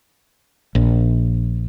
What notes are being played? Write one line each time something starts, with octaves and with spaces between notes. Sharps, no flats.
A#1